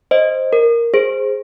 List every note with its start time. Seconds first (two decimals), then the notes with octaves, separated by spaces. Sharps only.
0.11 C5 D#5
0.53 A#4
0.94 G#4 C5